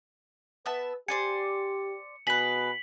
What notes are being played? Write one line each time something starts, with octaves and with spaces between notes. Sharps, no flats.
B3 B4 E5 A5
G4 C5 D5 G#5 C#7
B2 G#4 B4 B6 F#7